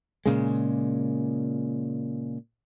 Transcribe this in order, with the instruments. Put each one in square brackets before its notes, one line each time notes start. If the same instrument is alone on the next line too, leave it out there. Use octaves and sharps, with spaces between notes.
[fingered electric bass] A#2 C#3 G#3